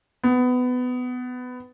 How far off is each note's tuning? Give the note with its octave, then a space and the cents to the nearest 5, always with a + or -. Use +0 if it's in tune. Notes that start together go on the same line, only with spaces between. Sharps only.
B3 +20